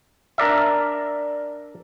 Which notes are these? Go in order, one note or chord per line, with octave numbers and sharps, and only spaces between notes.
D4 A#4 D5 E5